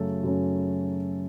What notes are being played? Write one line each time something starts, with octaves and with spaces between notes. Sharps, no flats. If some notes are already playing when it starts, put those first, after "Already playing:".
Already playing: F#2 C#3 F#3 A3 C#4 A4
F#2 C#3 F#3 A3 C#4